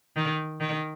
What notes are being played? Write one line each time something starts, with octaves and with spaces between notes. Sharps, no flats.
D#3
D#3